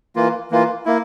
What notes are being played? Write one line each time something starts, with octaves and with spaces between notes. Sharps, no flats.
E3 A#3 F4
E3 A#3 F4
A#3 E4